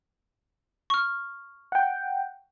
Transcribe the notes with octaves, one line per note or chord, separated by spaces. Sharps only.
C#6 F6
F#5 G5